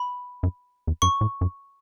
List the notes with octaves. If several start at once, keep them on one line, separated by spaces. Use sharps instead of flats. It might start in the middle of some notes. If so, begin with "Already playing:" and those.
Already playing: B5
F#2
E2
F#2 C#6
A2
F#2